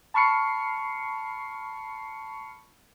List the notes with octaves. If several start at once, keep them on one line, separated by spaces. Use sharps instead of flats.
A5 B5 C#6 F6 C7 C#7